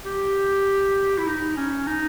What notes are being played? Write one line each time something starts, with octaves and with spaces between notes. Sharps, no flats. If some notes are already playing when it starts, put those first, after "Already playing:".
G4
E4
D#4
C#4
D#4